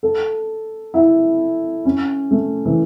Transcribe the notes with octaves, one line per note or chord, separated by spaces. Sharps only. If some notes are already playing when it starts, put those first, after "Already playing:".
A4
E4
C#4
A3
E3